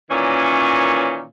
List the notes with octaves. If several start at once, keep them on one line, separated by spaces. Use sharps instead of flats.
A#2 D#3 E3 C#4 C#5